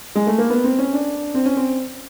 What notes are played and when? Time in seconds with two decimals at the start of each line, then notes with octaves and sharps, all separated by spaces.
0.15 G#3
0.27 A3
0.38 A#3
0.50 B3
0.64 C4
0.79 C#4
0.93 D4
1.34 C4
1.46 C#4
1.56 C4